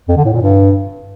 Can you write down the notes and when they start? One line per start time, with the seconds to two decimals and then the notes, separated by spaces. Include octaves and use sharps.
0.08 F2
0.17 D3
0.25 A2
0.33 A#2
0.42 G2